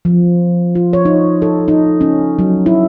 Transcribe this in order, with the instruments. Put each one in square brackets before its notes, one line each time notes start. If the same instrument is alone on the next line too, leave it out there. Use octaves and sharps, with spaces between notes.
[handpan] F3
F4
C#5
D#4
A4
D#4
C#4
F#3
E4